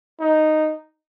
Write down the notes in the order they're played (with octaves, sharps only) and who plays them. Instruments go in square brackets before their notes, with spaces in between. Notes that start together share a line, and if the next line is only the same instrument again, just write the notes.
[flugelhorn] D#4